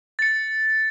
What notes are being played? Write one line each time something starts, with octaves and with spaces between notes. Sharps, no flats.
A6 C#7